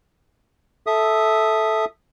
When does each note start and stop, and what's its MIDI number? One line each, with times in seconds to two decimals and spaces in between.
0.87 1.85 69
0.87 1.85 76
0.87 1.85 87